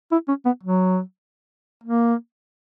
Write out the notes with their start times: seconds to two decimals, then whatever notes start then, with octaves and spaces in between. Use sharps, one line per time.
0.12 E4
0.28 C#4
0.45 B3
0.63 F#3
1.83 A#3